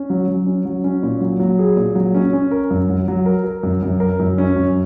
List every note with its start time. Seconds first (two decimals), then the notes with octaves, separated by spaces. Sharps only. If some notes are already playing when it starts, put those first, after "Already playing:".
Already playing: C#4
0.10 F#3
0.28 F#3
0.46 C#4
0.65 F#3
0.84 C#4
1.03 A#2
1.21 F#3
1.39 F#3
1.59 G#4
1.77 A#2
1.95 F#3
2.15 C#4
2.33 C#4
2.51 A#4
2.71 F#2
2.89 F#3
3.08 F#3
3.26 A#4
3.44 A#4
3.63 F#2
3.82 F#2
4.00 A#4
4.19 F#2
4.38 C#4
4.56 F#2